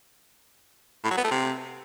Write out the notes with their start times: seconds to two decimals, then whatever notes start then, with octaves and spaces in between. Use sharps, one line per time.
1.04 A2
1.11 F#3
1.17 B3
1.24 A3
1.31 C3